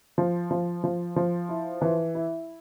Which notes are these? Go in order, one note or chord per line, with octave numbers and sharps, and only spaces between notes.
F3
F3
F3
F3
E4
E3
E4